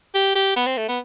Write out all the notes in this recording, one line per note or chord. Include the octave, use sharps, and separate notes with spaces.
G4
G4
B3
C4
A3
B3